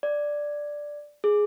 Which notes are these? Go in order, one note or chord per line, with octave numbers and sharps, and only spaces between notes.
D5
G#4